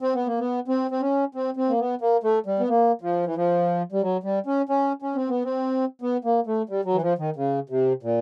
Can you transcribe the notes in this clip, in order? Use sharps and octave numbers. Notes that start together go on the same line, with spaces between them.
C4
B3
A#3
B3
C4
C4
C#4
C4
C4
A#3
B3
A#3
A3
G3
B3
A#3
F3
E3
F3
G3
F#3
G3
C#4
C#4
C#4
C4
B3
C4
B3
A#3
A3
G3
F#3
E3
F3
D#3
C#3
C3
A#2